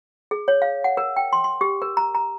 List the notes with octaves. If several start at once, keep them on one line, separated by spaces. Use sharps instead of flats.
G#4
C#5
F5
F#5
A#4
G5
C6
C6
G4
A#4
A#5
A#5